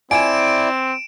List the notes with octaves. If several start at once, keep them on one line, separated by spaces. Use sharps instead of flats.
C4 E4 D5 G#5 D7 E7